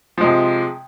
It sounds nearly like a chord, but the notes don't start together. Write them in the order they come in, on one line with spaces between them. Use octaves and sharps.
F3 G#3 C3